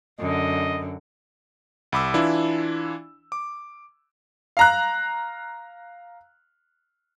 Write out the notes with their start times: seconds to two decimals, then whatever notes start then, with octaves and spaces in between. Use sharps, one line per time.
0.19 F#2 D3 D#5
1.92 C2 B5 D6 E6
2.14 E3 D4 E4 F4
3.32 D6
4.57 F5 A#5 F#6